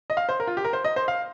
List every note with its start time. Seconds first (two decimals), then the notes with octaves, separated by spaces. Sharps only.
0.10 D#5
0.17 F5
0.29 C5
0.40 A#4
0.47 F4
0.57 G4
0.65 A#4
0.73 C5
0.84 D#5
0.96 C5
1.08 F5